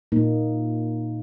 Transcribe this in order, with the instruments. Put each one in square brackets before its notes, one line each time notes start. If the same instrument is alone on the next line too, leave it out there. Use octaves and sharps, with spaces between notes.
[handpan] A#2 A#3 D#4